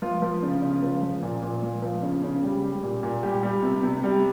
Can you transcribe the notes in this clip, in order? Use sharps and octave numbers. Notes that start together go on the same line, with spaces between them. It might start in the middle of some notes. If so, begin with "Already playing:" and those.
F3 F4
F3
C#3
C#3
F3
F3
A#2
A#2
F3
F3
C#3
C#3
G3
G3
A#2
A#2
G3 G4
G3
C3
C3
G3